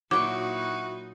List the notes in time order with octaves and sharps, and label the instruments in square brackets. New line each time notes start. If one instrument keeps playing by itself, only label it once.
[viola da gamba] A#2 D#4 [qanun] F#3 G5 C#6 [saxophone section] E4 F#4 [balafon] D6